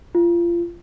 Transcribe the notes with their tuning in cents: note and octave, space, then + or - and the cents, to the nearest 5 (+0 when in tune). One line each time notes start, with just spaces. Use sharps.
F4 -25